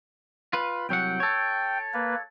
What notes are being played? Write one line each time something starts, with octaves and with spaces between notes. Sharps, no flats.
F4 B4
C2 F#3 F#5 G5
A4 C#5
A#3 B4